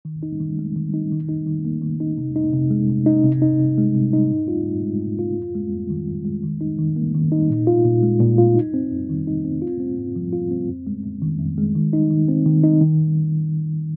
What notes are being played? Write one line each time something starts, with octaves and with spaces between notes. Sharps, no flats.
D#3
D#4
D#3
G#3
D#3
D#4
D#3
D#4
D#3
A#3
D#3
D#4
C3
D#4
C3
G#3
C3
D#4
C3
D#4
C3
G#3
C3
D#4
G#2
F4
G#2
G#3
G#2
F4
F2
G#3
F2
D#3
F2
G#3
D#3
D#4
D#3
A#3
D#3
D#4
A#2
F4
A#2
G#3
A#2
F4
D#4
C4
F2
D#3
D#4
C4
F4
C4
G#2
F3
F4
C4
F2
G#3
F2
D#3
F2
G#3
D#3
D#4
D#3
C4
D#3
D#4
D#3